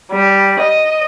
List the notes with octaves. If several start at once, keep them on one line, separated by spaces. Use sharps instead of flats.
G3
D#5